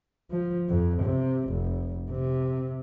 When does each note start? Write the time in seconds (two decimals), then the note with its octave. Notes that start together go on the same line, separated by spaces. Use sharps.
0.31 F3
0.69 F2
1.03 C3
1.49 F1
2.11 C3